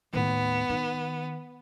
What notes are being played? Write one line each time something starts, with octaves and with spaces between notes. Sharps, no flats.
D#2 A2 B3
D#3